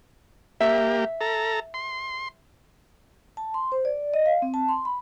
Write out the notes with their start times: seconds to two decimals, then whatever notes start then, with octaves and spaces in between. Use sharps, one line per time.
0.61 A#3 G4 E5
1.21 A4 A#5
1.74 C6
3.37 A5
3.54 C6
3.72 C5
3.85 D5
4.14 D#5
4.26 F5
4.42 C4
4.54 A5
4.69 C6
4.85 B5